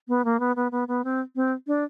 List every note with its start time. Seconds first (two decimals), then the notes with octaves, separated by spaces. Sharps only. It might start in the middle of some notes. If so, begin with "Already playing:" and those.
0.08 B3
0.25 A#3
0.40 B3
0.56 B3
0.72 B3
0.88 B3
1.04 C4
1.36 C4
1.67 D4